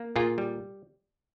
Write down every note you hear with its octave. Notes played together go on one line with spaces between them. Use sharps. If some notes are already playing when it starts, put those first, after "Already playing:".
Already playing: A#3
A#2 F4 G#4
G3